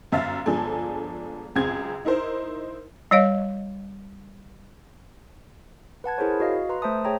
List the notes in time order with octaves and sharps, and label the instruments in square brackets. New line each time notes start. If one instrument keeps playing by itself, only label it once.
[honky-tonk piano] G1 F#2 E5 F5 A6
G1 F3 G#3 D4 A4 G#5
C#2 F#2 C4 G#4 G#6
D#4 E4 A#4 C5
[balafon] G3 C#5 D#5 F5
[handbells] B4 F#5 A5 G#6
E4 G#4 A#4 C5 C#5
F#4 D#5 F5
B4 A#5 C6
A3 C5 E5 A5 D#6
G#4 C#5 G5 A#5